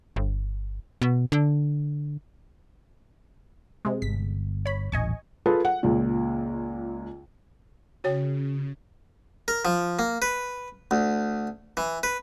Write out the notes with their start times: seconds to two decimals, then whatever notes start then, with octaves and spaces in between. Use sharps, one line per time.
0.16 G1
1.02 B2
1.32 D3
3.85 C3 G#3
4.02 G1 B6
4.66 C#5 B5
4.92 D#1 A1 D#5 G#5 C#6
5.46 F4 G#4 A4 B4
5.65 F#5
5.83 C#2 A#2
8.04 C#3 F#4 C#5 G5
9.48 A#4
9.65 F3
9.99 A#3
10.22 B4
10.91 D2
11.77 E3
12.03 B4